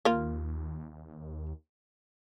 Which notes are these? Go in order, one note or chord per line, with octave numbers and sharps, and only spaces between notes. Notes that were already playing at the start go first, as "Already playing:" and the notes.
D#2 A#3 F4